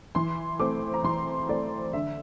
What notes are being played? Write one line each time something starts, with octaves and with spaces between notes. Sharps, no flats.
E3 C6
A3 C4 D6
A#5
E3 C6
A3 C4 D5
D3 E5